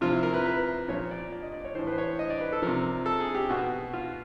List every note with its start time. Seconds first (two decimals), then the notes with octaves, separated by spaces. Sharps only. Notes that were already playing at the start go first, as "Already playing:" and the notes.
0.01 C3 F3 F4
0.12 E4
0.23 A#4
0.34 B4
0.46 B4
0.88 A#2 F3 C#5
1.11 D5
1.32 D5
1.43 D#5
1.53 D5
1.65 C#5
1.75 E3 C5
1.79 A2
1.87 B4
1.93 C5
1.98 C#5
2.19 D#5
2.30 D5
2.41 B4
2.52 A4
2.62 C3 F3 A#4
3.06 A4
3.20 G#4
3.35 G4
3.49 B2 F#4
3.93 F4